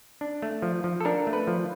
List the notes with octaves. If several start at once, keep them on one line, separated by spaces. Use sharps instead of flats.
D4
A3
F3
F3
A4
D4 A#4
A3
B4
F3